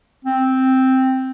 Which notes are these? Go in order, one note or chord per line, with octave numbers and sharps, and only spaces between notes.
C4